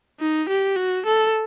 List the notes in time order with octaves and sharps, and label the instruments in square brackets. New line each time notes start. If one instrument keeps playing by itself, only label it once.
[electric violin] D#4
G4
F#4
A4